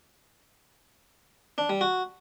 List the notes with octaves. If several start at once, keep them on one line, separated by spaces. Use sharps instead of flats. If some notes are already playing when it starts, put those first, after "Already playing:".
D4
G3
F#4